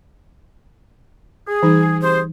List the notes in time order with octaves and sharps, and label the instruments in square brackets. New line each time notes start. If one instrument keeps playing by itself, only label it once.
[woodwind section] G#4
[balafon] E3 G3 D#4
[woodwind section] C3 G#4 C5